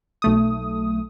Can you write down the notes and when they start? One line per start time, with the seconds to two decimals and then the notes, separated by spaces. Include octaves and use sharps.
0.22 B1 A3 D#6